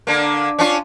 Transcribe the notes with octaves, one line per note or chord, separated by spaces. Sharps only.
D3 A#3
C#4 D4 F4